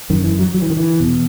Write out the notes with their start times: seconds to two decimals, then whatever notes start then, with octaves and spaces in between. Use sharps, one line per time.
0.10 F#2 D#3
0.24 E3
0.39 F#3
0.54 F#3
0.62 E3
0.70 D#3
0.77 E3
1.00 E2 B2